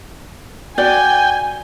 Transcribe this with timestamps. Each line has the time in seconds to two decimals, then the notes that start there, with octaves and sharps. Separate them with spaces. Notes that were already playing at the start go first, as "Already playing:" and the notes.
0.78 F#4 D5 G5 G#5